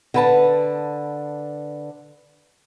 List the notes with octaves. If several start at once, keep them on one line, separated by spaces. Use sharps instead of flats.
D3 B4 A5